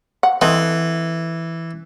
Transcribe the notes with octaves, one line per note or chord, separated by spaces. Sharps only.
F#5
E3 C4 A4 D#5